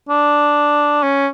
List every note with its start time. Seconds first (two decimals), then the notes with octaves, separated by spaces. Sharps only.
0.09 D4
1.03 C#4